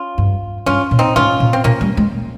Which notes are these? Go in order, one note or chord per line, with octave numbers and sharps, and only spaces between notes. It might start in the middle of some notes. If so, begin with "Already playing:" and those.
Already playing: C#4 F4
G2
G2 C#4 F4
A#2
C4 D#4
G#2 C#4 F4
A#2
C4
A#2 A#3 C#4
G3
G#3